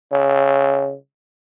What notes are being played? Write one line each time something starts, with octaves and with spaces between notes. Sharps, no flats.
C#3